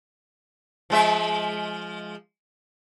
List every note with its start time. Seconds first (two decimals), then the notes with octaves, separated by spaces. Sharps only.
0.90 F3 G#3 E5